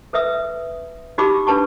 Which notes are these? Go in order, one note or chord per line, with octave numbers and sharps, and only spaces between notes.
A4 B4 E5 D#6 E6
D#4 F#4 G4 B5 D6 E6
D4 B4 A5 C#6